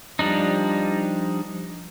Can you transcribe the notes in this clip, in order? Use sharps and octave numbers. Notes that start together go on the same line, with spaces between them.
F3 G3 D4 D#4